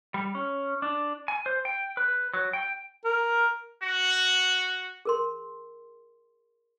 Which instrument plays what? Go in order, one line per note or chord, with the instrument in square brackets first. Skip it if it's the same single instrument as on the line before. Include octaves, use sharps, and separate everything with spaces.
[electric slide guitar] G3
C#4
D4
G#5
C5
G5
B4
F#3
G5
[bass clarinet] A#4
[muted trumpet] F#4
[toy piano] G#4 A#4 C6